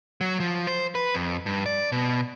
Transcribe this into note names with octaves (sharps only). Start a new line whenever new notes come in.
F#3
F3
C5
B4
F2
G2
D5
B2